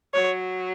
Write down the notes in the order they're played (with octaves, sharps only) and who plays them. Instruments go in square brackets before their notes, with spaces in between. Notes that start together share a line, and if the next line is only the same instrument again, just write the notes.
[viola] F#3 [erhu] C#5